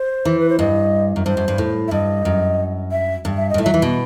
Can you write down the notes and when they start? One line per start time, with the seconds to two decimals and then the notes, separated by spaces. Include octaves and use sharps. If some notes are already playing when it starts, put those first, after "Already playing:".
Already playing: C5
0.25 E3
0.39 B4
0.49 C5
0.59 G2 D#5
1.16 F#2
1.25 G2 C5
1.37 F#2
1.48 G2
1.58 A2
1.88 E5
1.91 G2 D#5
2.25 F#2
2.91 E5
3.25 G2
3.37 E5
3.50 G2 D#5
3.58 A2
3.62 F#3 E5
3.74 E3
3.82 B2